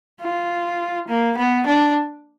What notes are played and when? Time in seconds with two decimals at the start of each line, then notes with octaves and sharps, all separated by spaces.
0.21 F4
1.08 A#3
1.37 B3
1.67 D4